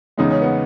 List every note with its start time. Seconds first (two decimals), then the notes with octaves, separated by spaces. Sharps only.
0.17 E2 C#3 G#3 D#4
0.30 C#4
0.42 B3